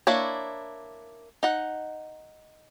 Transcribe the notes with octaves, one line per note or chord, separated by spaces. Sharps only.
A#3 D4 E4 C#5
D#4 F#5